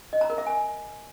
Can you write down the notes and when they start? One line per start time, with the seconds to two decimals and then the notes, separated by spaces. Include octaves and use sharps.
0.13 D#5
0.21 A#5
0.30 A#4
0.38 E5
0.46 G#5